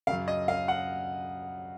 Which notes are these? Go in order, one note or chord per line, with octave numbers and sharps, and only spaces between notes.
F#2 C#3 F5
D#5
F5
F#5